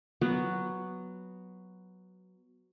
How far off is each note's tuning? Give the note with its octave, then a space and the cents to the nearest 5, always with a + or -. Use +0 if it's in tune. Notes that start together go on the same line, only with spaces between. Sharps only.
F#3 +0 B3 +0